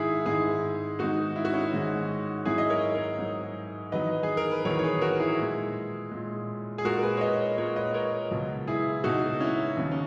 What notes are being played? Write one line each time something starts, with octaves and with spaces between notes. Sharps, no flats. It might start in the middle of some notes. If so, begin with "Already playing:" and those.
Already playing: G#2 D#3 G#3 E4 G#4
G#2 D#3 G#3 E4 G#4
G#2 D#3 G#3 D#4 F#4
E4
F#4
C#4 E4
G#2 D#3 G#3
G#2 F#3 E4 G#4
D#5
A#4 C#5
A#4 C#5
G#2 F#3
E2 D#3 F#3 B4 D#5
G#4
A#4
B4
E2 D#3 F#3 A#4 C#5
C#5
G#4 B4
F#4 A#4
E4 G#4
A#2 G#3
A#2 G#3
G#4
A#2 G#3 F#4 A#4
A#4
G#4 B4
C#5
B4 D#5
A#2 G#3 A#4 C#5
B4 D#5
A#4 C#5
C#2 B2 F#3
E4 G#4
C#2 B2 F#3 D#4 F#4
C#4 E4
D#2 C#3 F#3 C#4
C#4